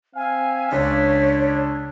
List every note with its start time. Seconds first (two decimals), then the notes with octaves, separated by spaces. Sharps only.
0.16 C4 E5 F5 G#5
0.72 C#2 D4 C#5 B6